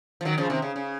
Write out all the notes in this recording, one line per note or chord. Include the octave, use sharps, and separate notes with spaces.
F3
D#3 F#3
C#3 F3
C3 D#3
C#3
C#3